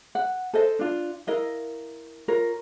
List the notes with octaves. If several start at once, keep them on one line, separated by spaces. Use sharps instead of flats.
F#5
A4 C5 D#5
D4 F4
E4 A#4 D#5 F5
F4 A#4 C#5